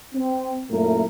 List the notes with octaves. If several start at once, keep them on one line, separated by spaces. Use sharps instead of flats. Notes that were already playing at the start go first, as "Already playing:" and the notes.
C4
F#2 A#2 A3 A#3 E4 A#4